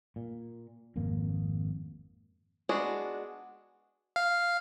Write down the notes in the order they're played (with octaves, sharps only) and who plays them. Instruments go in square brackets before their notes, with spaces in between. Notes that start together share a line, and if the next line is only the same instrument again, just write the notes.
[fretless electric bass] A#2
G#1 F2 A#3
[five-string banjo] G#3 B3 D4 F#4 G#4
[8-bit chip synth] F5